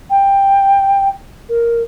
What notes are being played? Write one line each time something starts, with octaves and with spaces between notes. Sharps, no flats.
G5
A#4